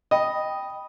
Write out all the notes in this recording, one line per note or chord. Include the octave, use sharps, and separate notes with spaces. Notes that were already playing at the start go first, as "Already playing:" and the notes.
D#5 G5 B5 D#6